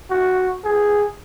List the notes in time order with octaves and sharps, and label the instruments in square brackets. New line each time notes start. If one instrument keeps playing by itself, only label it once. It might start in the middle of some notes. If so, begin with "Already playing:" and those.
[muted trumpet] F#4
G#4